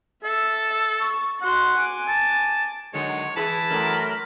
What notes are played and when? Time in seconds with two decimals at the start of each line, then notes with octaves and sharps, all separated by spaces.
0.24 A4 E5
1.00 C#6
1.42 F#4 F#5 C6
1.78 G#5 D6
2.08 A5
2.94 D3 D#3 F#3 G#3 C#5
3.37 E3 E4 G#4 A5 B5
3.70 F#2 A3 A#4